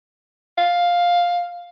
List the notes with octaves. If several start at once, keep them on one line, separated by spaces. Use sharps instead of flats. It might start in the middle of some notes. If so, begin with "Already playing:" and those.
F5